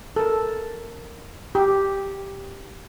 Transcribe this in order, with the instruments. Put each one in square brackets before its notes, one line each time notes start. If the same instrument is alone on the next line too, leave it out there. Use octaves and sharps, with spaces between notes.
[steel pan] A4 A#4
G4